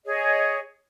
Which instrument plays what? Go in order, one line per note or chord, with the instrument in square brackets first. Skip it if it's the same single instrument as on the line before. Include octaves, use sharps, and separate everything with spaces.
[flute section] G#4 C#5 D#5